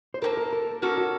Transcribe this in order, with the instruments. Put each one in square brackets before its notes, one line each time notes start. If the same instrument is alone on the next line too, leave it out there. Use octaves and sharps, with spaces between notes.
[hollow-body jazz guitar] C5
[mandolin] A#3 C#4 A4 [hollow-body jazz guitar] A#4
[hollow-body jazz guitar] A#4
A#4
[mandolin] A#3 C#4 A4 [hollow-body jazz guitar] F#4
[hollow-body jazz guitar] F#4